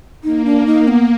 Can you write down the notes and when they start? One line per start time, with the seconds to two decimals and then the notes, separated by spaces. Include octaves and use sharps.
0.24 A#3 D#4
0.45 D4
0.66 D#4
0.88 B3